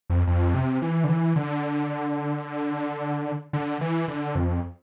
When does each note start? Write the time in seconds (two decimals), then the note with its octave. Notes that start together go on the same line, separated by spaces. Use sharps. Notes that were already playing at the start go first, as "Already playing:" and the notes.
0.10 F2
0.27 F2
0.54 C3
0.82 E3
1.04 D3
1.09 E3
1.36 D3
3.53 D3
3.81 E3
4.08 D3
4.35 F2